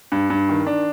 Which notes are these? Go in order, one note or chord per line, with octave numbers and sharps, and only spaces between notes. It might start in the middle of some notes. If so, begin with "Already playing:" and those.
G2
G2
D#3
D#3 D4